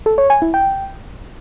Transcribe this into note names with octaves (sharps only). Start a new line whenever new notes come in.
A4
C#5
G#5
E4
G5